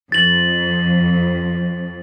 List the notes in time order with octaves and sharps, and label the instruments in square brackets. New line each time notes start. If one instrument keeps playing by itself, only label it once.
[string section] F2 [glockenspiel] A6 F#7